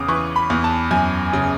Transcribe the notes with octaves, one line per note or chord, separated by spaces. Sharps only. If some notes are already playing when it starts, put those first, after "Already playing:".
Already playing: E2 C#3 D6 D#6
E3 C#6
B5
E2
A5
F#2 G#5
C#3